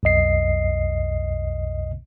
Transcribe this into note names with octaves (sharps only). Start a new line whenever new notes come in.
B1 F2 D#5 C7